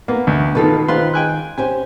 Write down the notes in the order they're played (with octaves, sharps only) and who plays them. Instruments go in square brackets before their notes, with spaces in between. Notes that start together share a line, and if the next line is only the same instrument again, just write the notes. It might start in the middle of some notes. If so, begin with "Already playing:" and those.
[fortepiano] A#3 [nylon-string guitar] B3
[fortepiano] D2
[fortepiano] B2 D#3 [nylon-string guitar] F4 A4 B4
[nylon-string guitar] D#3 C5 [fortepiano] F4 B4 C6
[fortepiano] G5 G#5 F#6
[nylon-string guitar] C#4 G4 C5 [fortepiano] G#5